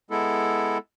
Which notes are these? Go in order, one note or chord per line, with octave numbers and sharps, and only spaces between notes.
G#3 B3 E4 A4